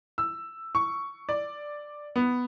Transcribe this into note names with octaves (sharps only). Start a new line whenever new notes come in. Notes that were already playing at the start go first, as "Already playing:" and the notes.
E6
C#6
D5
B3